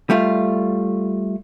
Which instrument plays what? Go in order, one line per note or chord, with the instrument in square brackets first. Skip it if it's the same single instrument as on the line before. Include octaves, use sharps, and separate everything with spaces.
[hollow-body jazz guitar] G3 A3 F4